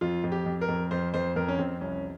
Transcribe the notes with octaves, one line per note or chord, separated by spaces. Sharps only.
F2 F4
F2
G4
F2
A#4
F2
F2 C5
F2 C5
F2 A#4
C#4
F2 C4
C2 C#4